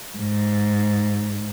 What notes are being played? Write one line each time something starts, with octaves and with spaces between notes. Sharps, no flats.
G#2